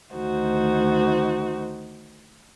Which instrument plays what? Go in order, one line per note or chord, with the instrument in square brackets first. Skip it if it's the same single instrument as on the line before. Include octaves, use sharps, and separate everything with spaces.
[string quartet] D2 D#3 D#4 F#4 C5